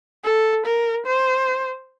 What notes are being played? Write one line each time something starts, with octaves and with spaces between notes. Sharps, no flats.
A4
A#4
C5